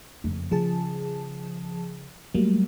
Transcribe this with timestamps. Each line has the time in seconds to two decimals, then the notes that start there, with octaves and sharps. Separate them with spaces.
0.24 F#1 F2
0.51 C#3 F3 G#4 A5
2.34 F#3 G3 A3 A#3